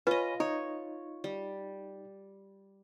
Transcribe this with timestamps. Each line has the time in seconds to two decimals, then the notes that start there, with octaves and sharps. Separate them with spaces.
0.07 F4 B4 C#5 D#5 G#5 B5
0.40 D#4 C#5
1.24 G3